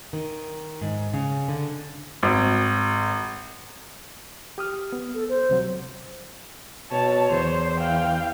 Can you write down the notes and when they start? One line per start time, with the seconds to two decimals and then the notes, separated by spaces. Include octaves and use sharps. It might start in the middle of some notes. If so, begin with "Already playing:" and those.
0.13 D#3
0.81 G#2
1.13 C#3
1.48 D3
2.23 G#1
4.58 G4 D#6 F6
4.92 B3
5.14 A4
5.29 C5
5.49 D2 C3 F#3
6.92 B2 C#5 A5
7.31 E2 E3 C5
7.80 F5 G5